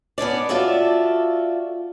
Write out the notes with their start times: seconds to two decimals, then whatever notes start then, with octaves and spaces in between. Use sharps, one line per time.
0.18 B3 C#4 D4 D5
0.49 F4 F#4 A4 D5 E5